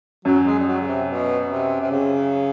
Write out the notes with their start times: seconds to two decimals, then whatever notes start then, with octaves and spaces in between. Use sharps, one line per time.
0.25 F#2 F#3
0.46 G#3
0.60 G3
0.68 F#3
0.81 C#3
0.87 C3
1.09 B2
1.51 C3
1.81 C3
1.92 C#3